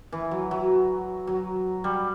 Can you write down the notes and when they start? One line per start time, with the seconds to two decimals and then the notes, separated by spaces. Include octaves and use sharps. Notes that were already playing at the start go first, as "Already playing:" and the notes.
0.12 E3
0.31 F#3
0.51 F#3
1.27 F#3
1.84 G3